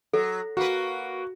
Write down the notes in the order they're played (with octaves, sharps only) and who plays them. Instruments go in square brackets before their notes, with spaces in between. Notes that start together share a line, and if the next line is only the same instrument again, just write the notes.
[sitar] F#3 [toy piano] A4
[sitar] A#3 B4 [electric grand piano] F#4